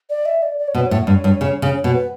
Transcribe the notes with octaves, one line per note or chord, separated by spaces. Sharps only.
D5
E5
D5
D5
C#5
B2 B4
C#5
A2
G2
G2
C#3
C#3
B2
B4